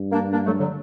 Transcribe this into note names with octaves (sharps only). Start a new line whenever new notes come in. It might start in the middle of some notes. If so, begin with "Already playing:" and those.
Already playing: G2
A#3 D4
A#3 D4
F#3 A3
D3 F#3